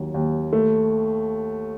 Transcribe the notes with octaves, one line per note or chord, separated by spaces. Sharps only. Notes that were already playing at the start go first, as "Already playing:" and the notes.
Already playing: D#2 F#3
D#2
A3